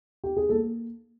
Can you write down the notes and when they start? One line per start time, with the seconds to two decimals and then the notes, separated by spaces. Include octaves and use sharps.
0.24 G4
0.37 G#4
0.49 A#3 A4